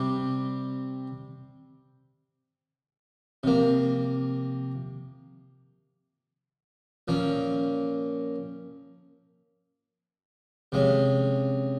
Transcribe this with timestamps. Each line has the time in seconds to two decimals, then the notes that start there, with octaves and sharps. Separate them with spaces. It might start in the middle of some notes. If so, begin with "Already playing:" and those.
Already playing: C3 G3 C4 G4
3.43 C3 F3 A#3
7.08 A#2 F3 A#3 C#4
10.72 C3 F3 G#3 C#4